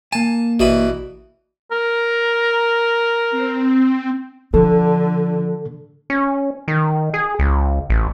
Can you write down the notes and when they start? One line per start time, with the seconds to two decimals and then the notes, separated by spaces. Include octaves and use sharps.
0.12 A#3 G#5 A5
0.60 A1 B2 E3 F#4 D5 B5
1.72 A#4
3.31 C4
4.54 D3 F3 A4
6.10 C#4
6.68 D#3
7.14 G#4
7.39 C#2
7.90 A1